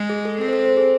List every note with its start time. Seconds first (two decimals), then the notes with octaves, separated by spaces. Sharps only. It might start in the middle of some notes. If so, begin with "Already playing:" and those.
Already playing: G#3
0.10 G#4
0.25 A4
0.41 C4 A4
0.48 C5
0.53 A4
0.66 C5
0.77 G#4